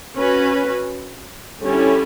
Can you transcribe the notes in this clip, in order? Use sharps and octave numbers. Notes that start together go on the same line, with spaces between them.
C#4 F#4 B4
D3 G3 C#4 E4